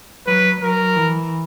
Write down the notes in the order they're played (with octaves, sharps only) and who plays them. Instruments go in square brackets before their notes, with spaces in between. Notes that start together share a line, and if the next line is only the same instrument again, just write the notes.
[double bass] F#3 [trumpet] B4
[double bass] F#3 [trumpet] A#4
[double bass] E3